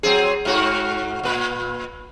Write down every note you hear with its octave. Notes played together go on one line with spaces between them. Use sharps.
F#3 C4 G#4
G#2 F#4
A#2 B4